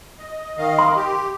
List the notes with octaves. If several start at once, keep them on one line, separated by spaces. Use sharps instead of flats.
D#5
D#3 D#5 F5
C6
G4